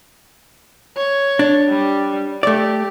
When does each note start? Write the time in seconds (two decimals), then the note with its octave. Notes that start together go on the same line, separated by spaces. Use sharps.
0.96 C#5
1.39 D4
1.69 G3
2.43 A3 G4 D5